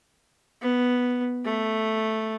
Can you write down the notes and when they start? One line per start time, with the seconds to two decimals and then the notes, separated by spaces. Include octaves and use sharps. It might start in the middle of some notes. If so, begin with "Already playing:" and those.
0.62 B3
1.45 A3